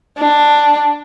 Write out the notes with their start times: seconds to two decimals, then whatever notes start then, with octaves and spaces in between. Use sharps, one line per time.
0.19 D4